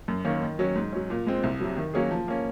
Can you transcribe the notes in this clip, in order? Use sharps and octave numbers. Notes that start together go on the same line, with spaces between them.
F#2
D#3 A#3 C#4
D#3
F#3 C#4
G#2
F#3 C#4
A#2
G#3 C4
C2
C3 F#3
D#3
F#3 A#3 C#4 G#4
F3
A#3 C#4